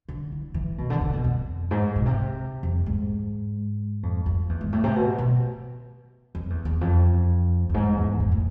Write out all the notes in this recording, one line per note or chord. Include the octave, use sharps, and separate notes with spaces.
D3
E3
E3
B2
D3
C3
B2
F2
G#2
B2
C3
F2
G#2
F2
F2
E2
G#2
A2
C3
B2
B2
F2
E2
E2
F2
F2
G#2
E2
F2
A2